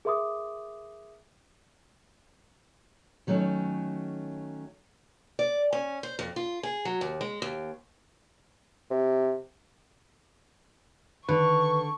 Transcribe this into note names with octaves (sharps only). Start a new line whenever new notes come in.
G#4 A#4 E5 C6 D6 D#6
D#3 F#3 A3 C#4
D5
C#4
C5
F2
F4
G#4
F#3
D#2
G#3
D#2
C3
D3 D#3 D4 B4 C#6